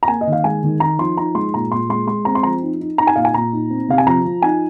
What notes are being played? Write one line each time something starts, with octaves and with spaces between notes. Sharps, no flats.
A#5
A#3 G#5
D#5
D#3
F5
G#3 G#5
D#3
D#4 A#5
F3 C6
D#4 A#5
G#3 C6
A#2 A#5
A#2 C6
G#3 C6
G#3 C6
C4 A#5
C6
F3 A#5
D#4
D#4
D#4 A#5
G#5
A#2 F5
G#5
A#2 A#5
D#4
C4
C3 F5
G#5
F3 A#5
F3
D#4 G#5